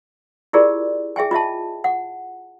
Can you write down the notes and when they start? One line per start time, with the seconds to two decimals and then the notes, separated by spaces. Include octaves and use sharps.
0.53 E4 F4 G4 G#4 A#4 D5
1.16 G#4 E5 G5 G#5
1.31 F4 D#5 E5 A5
1.84 F#5